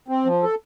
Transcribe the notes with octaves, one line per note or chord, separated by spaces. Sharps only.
C4
F3
A4